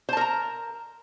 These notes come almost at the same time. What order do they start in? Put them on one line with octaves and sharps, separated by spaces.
C5 A5 A#4 A#5